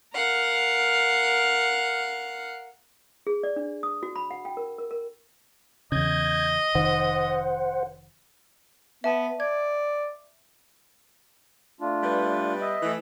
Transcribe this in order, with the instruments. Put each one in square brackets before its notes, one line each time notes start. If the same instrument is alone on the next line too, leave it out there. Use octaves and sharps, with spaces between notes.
[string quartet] A#4 F5 F#5
[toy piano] G#4
D5
D4
D#6
F#4
B5
F#5
G5
A#4
A#4
A#4
[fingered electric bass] E2 C#3 [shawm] D#5 [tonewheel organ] G6 G#6
[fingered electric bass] F1 D#3 [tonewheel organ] C5 F#5
[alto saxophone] B3 [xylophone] E5 A5
[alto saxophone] D5 [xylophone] G#6
[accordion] A3 D4 F4
[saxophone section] G3 B3 B4
[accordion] D#5 E5
[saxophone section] E3 A3